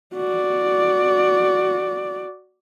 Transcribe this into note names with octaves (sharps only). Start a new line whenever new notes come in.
F#4 D5